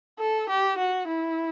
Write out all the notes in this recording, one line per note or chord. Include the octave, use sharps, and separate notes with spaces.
A4
G4
F#4
E4